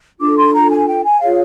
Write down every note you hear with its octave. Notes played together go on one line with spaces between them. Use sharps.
D4 F4 A4 D6
C6
A#5
G#5
G5
G#5
F4 G#4 C#5 F5